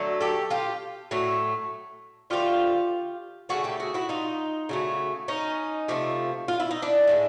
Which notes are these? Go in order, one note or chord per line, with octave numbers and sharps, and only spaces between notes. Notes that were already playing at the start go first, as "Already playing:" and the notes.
Already playing: D3 F#3 A3
G4 A4
F4 G4
A2 F#3 A3
D3 F3 A3 F4 G4
C#3 F3 A3 F#4 G#4
G4 A4
F#4 G#4
E4 F#4
D#4 F4
C#3 F#3 A3
C#4 D#4
C3 F3 A3
F4
E4
D#4
D4 E4
A2 F3 G#3